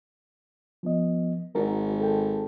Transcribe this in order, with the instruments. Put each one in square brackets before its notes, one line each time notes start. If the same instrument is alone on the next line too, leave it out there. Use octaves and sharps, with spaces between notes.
[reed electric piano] F3 B3 D#5
[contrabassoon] G#1 [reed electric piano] F#4 A#4
[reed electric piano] A4 G5